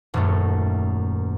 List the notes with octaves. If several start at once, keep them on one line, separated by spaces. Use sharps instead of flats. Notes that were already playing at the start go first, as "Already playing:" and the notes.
D#1 F#2 A3